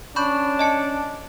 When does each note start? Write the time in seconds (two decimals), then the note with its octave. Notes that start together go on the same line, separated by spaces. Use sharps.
0.16 C#4 D4 B5 C#6 G6
0.59 D#5 A5 C#7